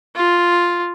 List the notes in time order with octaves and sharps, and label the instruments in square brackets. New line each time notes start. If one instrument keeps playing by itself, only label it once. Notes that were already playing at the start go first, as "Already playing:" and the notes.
[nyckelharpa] F4